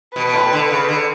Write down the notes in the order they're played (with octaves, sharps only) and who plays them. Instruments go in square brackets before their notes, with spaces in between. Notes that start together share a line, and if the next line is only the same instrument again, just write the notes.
[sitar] B2 [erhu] B4
[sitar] B2
A2
B2
D3
C#3
D3